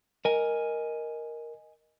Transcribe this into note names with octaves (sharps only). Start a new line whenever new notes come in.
A#4 D#5 G#5